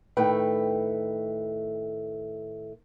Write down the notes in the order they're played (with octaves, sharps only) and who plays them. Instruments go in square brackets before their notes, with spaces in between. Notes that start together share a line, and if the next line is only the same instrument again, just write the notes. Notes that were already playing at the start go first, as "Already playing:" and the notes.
[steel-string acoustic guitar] A2 D#3 A3 B4 G5